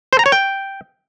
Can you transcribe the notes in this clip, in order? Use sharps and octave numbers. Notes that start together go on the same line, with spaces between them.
C5
A#5
C#5
G5